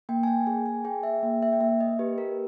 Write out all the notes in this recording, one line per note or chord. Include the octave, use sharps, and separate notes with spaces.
A#3 G5
G#5
G5
G#4 G#5
G#5
G#4 G5
E5
A#3 G5
E5
G5
A#3 E5
D#5
G4 B4
A#4